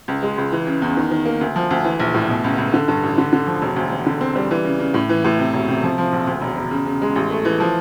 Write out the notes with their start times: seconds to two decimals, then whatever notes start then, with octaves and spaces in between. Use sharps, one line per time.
0.08 C#2
0.23 G#3
0.38 C#2
0.52 E3
0.67 C#3
0.82 E2
0.97 D#3
1.11 D#3
1.25 A#3
1.41 D2
1.56 F3
1.71 D2
1.84 E3
2.00 A#1
2.14 A2
2.29 B2
2.44 C#2
2.58 C#2
2.74 D3
2.88 G2
3.03 A1
3.18 D3
3.33 D3
3.47 F3
3.62 E1
3.76 D2
3.92 E1
4.06 D3
4.21 C4
4.36 G3
4.51 E3
4.65 C#3
4.80 C#3
4.94 A2
5.09 E3
5.24 A2
5.39 C3
5.54 E1
5.68 C3
5.83 F3
5.98 F3
6.12 A#1
6.27 D2
6.42 E1
6.57 E1
6.71 C#3
6.86 C#3
7.02 G#3
7.16 A1
7.30 A3
7.45 E3
7.60 F3